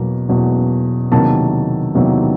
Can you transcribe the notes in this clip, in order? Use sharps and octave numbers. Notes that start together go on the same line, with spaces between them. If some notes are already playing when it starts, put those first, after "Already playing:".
Already playing: E2 B2 F#3 A#3
E2 B2 F#3 A#3
E2 C3 D#3 F#3 A#3 A5
E2 C3 D#3 F#3 A#3